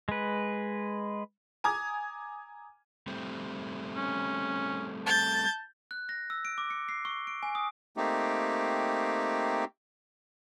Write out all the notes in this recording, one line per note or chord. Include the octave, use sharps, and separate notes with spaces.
G#3 B4
G#5 A#5 D6 D#6 G#6
G3 A3 C4
C#4
A5 G6 A6
F#6
A#6
E6
D7
D6
C#7
C7
C#6
D7
G#5
D#6
A3 A#3 C4 D#4 G4